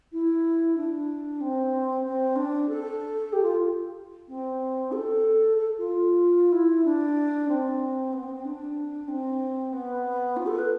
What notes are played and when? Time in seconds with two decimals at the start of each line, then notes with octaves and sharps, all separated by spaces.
0.12 E4
0.76 D4
1.40 C4
2.05 C4
2.35 D4
2.68 A4
3.32 G4
3.42 F4
4.28 C4
4.92 A4
5.57 A4
5.78 F4
6.52 E4
6.84 D4
7.48 C4
8.12 B3
8.23 C4
8.34 C4
8.45 D4
9.08 C4
9.72 B3
10.36 F4
10.46 A4
10.58 B4